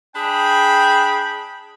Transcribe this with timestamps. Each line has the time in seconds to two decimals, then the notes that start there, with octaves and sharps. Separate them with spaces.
0.16 D4 G#4 G5 B5